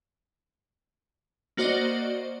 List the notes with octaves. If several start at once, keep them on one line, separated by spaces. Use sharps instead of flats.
A#3 F#4 C5 D5 D#5